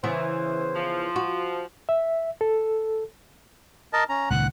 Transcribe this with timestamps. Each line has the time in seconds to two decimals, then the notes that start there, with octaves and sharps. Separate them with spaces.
0.04 C#3 E3 B3 C5
0.75 F3
1.16 F#4
1.89 E5
2.41 A4
3.93 A#4 D#5 A5
4.09 C#4 A#5
4.30 C#2 A#2 D#3 F#5 F#6